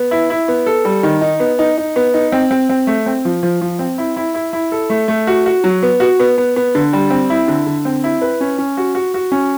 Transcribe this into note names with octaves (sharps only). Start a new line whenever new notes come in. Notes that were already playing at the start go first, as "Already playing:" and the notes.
Already playing: B3
E4
E4
B3
A4
G3
D#3
D#4
B3
D#4
D#4
B3
D#4
C4
C4
C4
A3
C4
F3
F3
F3
C4
E4
E4
E4
E4
A4
A3
A3
F#4
F#4
F#3
B3
F#4
B3
B3
B3
D3
G3
C4
E4
D3
D3
C4
E4
B4
C#4
C#4
F#4
F#4
F#4
C#4